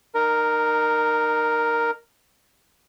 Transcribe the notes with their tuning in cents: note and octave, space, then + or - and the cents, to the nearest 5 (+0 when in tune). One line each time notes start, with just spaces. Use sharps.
D#4 -30 A#4 +0